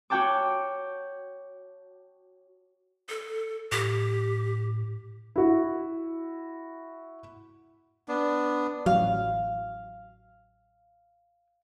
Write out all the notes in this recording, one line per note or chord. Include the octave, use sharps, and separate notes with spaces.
F#4 C#5 F#5 G5 A5 D6
A4
A2 G4
E4 F#4
B3 D4
A1 F#3 F5